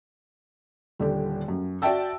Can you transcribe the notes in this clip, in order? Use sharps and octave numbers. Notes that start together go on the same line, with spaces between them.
D#1 D3 G4
F#2
F#4 D5 E5 G5 A5 E6